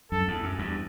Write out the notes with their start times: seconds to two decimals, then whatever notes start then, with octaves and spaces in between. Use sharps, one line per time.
0.12 F#2 A4
0.28 E2
0.43 F#2
0.59 E2 G2